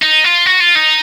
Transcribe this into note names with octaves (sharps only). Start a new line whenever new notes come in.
D#4
F4
F#4
F4
D#4